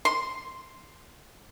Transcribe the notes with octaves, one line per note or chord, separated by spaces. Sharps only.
C6